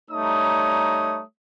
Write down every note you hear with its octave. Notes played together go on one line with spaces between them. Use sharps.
G3 A3 D#4 C#5 A#5 D#6